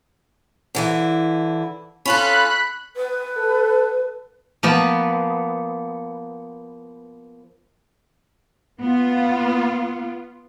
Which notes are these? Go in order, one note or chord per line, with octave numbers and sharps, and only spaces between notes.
D3 E3 E4
C#4 F4 A4 B5 F#6
B4
A4
F3 A#3 B3
B3 F4